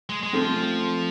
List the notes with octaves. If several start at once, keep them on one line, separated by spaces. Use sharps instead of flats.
G#3
G#3
F3 A3 C4